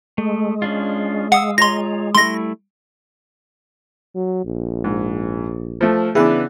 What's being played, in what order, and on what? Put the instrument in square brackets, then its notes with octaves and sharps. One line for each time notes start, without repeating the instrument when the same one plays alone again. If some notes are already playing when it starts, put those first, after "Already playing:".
[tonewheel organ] G#3 [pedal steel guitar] A3
[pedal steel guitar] C#4 D4 F4
[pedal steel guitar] F5 D#6 E6 [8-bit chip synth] F#5
[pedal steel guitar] F4 C#5 A#5 [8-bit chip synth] C6 A#6
[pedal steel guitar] G3 A3 E4 [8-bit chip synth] C6 A#6
[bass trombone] F#3
A#1
[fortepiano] G#2
F3 A3
[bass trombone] C#3 [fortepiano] E3 B3 D4 [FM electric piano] G#4 F#5